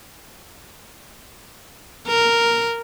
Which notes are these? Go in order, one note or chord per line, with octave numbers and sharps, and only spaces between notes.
A#4